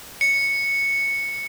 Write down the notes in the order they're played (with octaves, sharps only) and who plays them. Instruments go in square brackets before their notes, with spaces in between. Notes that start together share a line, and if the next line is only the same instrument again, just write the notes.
[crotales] C#7